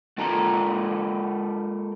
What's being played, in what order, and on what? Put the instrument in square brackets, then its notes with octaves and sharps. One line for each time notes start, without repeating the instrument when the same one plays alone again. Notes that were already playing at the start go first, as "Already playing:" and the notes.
[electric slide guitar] G#3 F4 A4 A#4 A#5